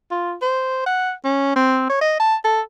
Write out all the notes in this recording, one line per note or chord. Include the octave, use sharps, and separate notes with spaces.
F4
C5
F#5
C#4
C4
C#5
D#5
A5
A4